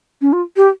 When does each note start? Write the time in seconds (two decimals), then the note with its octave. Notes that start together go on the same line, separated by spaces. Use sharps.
0.21 C#4
0.33 F4
0.57 G4